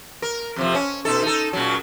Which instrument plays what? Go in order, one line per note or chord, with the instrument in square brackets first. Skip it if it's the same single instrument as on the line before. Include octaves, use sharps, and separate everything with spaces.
[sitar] A#4
F2 C3 F3
C#4
B2 D#4 A4
D#4 A4
A#2 C#3 F#3